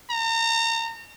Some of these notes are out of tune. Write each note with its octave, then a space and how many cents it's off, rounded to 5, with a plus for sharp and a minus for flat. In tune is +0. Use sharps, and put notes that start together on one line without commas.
A#5 -35